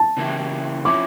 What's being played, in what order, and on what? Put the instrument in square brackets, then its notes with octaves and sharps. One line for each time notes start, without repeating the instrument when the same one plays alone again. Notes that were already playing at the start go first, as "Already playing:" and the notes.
Already playing: [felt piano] A5
[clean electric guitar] C#3 E3 A#3 E4 G4
[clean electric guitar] F3 C#4 E4 [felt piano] D6